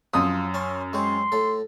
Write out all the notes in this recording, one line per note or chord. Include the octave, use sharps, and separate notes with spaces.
F#2 F3 D#6
C#4 A5 C6
G#3 C4 C#5 C6
A2 A4